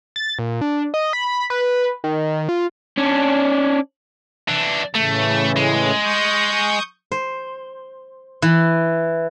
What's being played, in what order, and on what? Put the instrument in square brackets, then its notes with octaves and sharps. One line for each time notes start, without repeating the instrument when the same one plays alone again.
[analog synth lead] A6
A#2
D4
D#5
B5
B4
D#3
F4
[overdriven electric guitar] C#4 D4
[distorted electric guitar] E3 D4
[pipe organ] A2 C#3 E3 [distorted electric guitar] A3
[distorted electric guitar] G#3
[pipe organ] C#6 D#6 G6
[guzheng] C5
E3